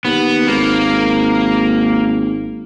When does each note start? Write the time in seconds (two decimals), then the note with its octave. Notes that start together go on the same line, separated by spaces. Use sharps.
0.05 D#2 B3
0.48 G#1 A#3